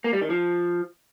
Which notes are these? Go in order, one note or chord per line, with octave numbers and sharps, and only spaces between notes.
A#3
G3
D#3
F3